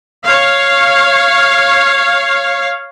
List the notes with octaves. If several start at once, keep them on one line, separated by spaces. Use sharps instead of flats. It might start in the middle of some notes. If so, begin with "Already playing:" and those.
C#5 F5